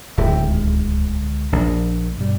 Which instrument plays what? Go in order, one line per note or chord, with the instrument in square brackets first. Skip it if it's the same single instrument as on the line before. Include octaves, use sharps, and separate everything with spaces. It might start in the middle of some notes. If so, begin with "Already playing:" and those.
[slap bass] D1 D#2 G#2 [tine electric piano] E5 G5
[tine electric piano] C#2 D3 G#3
[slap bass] A#1 [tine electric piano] D4
[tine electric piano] G2 B2 G3